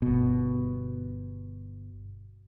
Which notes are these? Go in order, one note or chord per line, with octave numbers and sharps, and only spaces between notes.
G1 B2